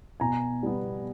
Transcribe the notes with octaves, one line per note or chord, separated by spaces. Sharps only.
B2 G#5 A#5
G3 B3